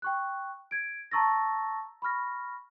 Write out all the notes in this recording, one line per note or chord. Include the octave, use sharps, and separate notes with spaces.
G5 C#6 F#6
G#6 D7
A5 A#5 C#6 E6 A6 A#6
B5 C#6 F6 A#6